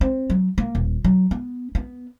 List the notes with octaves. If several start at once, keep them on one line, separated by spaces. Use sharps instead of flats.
C4
F#3
A#3
D#1
F#3
B3
B3